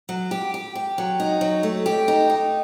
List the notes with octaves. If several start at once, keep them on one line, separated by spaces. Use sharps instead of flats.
F#3
G4
G4
G4
F#3
D#4
F#3
A3
G4
D#4
D#4